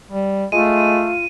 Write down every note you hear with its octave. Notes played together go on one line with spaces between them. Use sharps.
G3
G#3 A3 F4 D#7